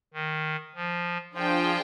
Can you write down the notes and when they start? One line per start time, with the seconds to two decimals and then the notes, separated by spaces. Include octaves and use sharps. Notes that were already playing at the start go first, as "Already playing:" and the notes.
0.14 D#3
0.75 F3
1.35 F3 D4 F4 G#4 C5 G5